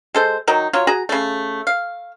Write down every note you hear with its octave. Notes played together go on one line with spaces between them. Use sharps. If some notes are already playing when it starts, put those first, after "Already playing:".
G#3 A4 C5
D#3 F#3 D#4
F#3 F4 C#5
F#4 G#4 A#5
C#3 A3
F5